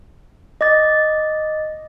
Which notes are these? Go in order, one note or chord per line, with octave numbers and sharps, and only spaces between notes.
D#5 D6 A6